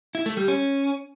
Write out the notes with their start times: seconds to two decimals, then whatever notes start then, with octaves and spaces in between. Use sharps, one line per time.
0.15 E4
0.26 A3
0.37 G3
0.48 C#4